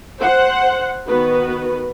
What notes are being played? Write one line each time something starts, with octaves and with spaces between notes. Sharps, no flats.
C5 F#5
D#3 B3 F#4 B4